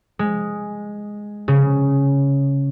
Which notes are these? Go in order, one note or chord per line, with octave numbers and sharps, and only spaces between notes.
G#3
C#3